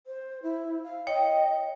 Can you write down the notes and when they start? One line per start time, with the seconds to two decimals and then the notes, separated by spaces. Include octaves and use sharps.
0.07 C5
0.43 E4
0.84 F5
1.07 C#5 D#5 G5